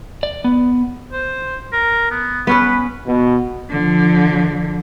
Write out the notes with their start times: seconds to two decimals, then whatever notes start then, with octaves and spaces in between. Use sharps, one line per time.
0.23 D5
0.44 B3
1.12 C5
1.72 A#4
2.11 B3
2.47 B3 C#4 B4 B5
3.06 B2
3.70 D3 F3